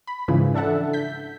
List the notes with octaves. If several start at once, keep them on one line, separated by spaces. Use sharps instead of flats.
B5
G#2 C#3 E3 F3
D4 A4 E5 F#5 A5
G6 B6